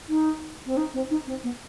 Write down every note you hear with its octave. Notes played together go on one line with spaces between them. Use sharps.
D#4
C4
D#4
C4
D#4
C4
B3